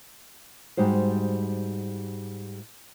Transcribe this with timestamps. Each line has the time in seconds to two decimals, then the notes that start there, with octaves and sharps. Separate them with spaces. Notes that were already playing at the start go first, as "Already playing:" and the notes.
0.77 G#2 G3 D#4 F#4 C5